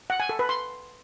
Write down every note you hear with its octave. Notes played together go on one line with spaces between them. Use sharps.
F#5
G#5
A4
B4
C6